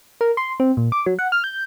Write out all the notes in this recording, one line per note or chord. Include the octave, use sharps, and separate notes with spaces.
A#4
C6
C4
A#2
D6
F#3
F#5
F6
G6